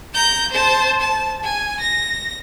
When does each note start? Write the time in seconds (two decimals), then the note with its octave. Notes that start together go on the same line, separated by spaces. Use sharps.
0.14 A#5 G6
0.52 C5 A5
1.01 A5
1.43 G#5
1.80 A#6